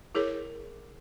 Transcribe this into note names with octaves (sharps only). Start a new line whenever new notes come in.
E4 G#4 A#4 C#5